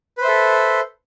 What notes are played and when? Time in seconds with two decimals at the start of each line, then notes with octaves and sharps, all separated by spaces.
0.18 B4
0.21 C5
0.25 E5
0.28 A4